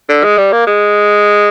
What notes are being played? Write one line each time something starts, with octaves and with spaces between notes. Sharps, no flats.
D3
G#3
G3
A#3
G#3